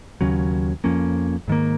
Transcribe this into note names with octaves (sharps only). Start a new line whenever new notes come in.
D#2 C#3 F#3 C#4
F2 F3 A#3 C#4
G#2 D#3 A#3